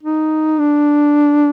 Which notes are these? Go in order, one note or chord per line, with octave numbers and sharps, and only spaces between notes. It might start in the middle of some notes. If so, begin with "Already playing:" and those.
D#4
D4